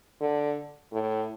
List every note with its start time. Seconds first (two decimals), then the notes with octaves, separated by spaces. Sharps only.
0.20 D3
0.92 A2